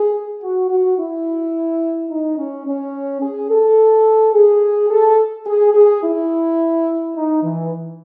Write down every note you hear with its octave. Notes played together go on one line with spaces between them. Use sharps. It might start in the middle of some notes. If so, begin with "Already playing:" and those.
Already playing: G#4
F#4
F#4
E4
D#4
C#4
C#4
G#4
A4
G#4
A4
G#4
G#4
E4
D#4
E3